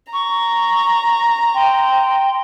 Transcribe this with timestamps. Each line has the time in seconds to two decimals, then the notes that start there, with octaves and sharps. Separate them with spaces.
0.13 A#5 C#6
1.54 G5 C6